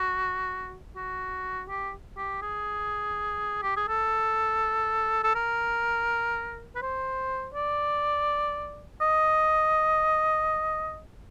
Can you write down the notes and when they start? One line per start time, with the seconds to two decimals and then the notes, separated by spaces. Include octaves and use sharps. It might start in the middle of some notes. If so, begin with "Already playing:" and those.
Already playing: F#4
0.96 F#4
1.69 G4
2.17 G4
2.42 G#4
3.63 G4
3.77 G#4
3.89 A4
5.24 A4
5.36 A#4
6.76 B4
6.82 C5
7.55 D5
9.01 D#5